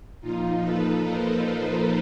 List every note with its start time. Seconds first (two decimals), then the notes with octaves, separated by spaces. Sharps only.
0.21 A#2 F3 D#4 F4
0.61 A4 B4
1.02 A#4 C5